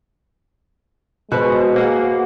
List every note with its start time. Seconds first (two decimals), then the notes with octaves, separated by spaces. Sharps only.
1.32 B2 G#3 F#4 B4 C5
1.76 A#3 G#4 F#5